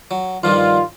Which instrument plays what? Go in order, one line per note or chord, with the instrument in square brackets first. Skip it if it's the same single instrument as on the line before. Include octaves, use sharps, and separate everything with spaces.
[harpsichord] F#3
[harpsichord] G2 F3 G3 [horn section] D#3 F4